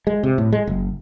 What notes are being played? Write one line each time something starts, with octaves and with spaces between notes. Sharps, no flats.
G#3
C3
A2
G#3
F#1